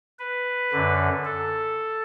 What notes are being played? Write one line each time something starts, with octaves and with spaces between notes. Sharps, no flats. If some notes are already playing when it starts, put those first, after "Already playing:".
B4
F#2 D3
A4